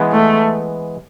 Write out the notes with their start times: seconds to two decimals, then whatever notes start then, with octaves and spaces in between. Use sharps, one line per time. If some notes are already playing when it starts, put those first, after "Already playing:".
Already playing: E3 G#3 B3
0.12 A3